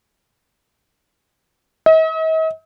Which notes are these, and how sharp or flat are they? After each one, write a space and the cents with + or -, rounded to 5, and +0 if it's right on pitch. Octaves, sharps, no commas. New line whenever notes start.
D#5 +45